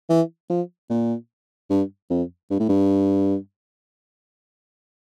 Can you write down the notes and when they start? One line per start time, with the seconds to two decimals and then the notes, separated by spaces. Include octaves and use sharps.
0.10 E3
0.50 F3
0.90 A#2
1.70 G2
2.10 F2
2.50 G2
2.59 A2
2.69 G2